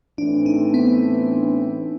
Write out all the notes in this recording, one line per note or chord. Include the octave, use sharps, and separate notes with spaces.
A2 E3 A3 C4 D4
D#4
B3